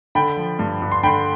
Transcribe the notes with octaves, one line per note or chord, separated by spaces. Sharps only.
D3 G5 B5
F3
G2
G2
C6
D3 G5 B5